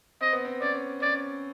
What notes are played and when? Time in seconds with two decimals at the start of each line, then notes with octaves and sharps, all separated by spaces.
0.21 C4 D#5
0.33 B3
0.45 C4
0.61 C#4 D5
1.02 C#4 D5